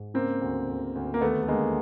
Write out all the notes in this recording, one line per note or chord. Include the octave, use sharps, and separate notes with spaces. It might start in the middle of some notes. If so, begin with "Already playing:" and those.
Already playing: G#2
C#3 A#3 C4
D2
D2
D2
A#3
D#2 A3 B3
A3
D3 G#3 A#3